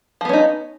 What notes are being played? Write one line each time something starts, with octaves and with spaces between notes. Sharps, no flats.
F3 B3 C#4 D#4